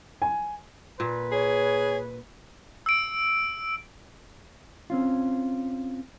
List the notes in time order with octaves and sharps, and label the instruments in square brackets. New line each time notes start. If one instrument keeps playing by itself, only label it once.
[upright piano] G#5
[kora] A#2 [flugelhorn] B4
[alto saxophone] G#4 [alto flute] C#5
[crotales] E6 D7
[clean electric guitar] C4 C#4 F4